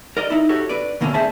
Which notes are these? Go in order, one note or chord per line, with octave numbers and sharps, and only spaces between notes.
A#4 D5 D#5
D#4 E4
F#4 G4 A4 C#5
D4 B4 D5
D2 B2 D3 A#3 B3 C#4
G#4 C5 D5 E5 G#5 A5